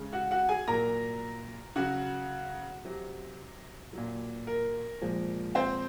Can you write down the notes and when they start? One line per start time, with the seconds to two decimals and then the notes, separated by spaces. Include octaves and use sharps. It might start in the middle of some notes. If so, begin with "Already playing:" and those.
Already playing: C#3 G#3
0.13 F#4 F#5
0.31 F#4 F#5
0.49 G#4 G#5
0.68 A#2 F#3 A#4 A#5
1.76 C#3 F#3 F#4 F#5
2.85 C3 F#3
3.93 A#2 F#3
4.47 A#4
5.01 A#2 F3 G#3
5.55 C4 C5